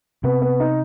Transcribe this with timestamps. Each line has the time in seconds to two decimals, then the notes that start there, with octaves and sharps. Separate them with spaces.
0.24 C3 B3
0.42 B3
0.60 D#4